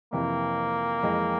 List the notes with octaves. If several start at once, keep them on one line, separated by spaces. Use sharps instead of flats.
F2 C3 E3 A#3
F2 E3 G#3